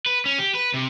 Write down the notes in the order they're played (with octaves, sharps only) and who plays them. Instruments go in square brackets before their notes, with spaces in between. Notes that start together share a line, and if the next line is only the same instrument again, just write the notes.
[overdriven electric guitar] B4
C#4
G4
B4
C3